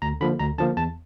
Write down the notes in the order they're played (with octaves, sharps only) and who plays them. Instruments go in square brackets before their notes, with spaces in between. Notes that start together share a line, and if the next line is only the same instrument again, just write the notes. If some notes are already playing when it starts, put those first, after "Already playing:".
[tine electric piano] D2 A#5
D3 F3 A#3 B5
D2 A#5
D3 F3 A#3 A5
E2 A5